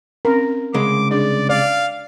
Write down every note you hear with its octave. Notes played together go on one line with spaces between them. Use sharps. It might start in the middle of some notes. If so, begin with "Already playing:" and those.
C4 C#4 A#4
C2 C#3 G#3 D6
D4 G#4 D5
D5 F5